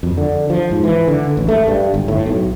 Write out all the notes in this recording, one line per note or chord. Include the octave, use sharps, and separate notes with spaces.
F2
D3
F3
G#2
E3
D3
A1
A3
G2
G1
A2
B1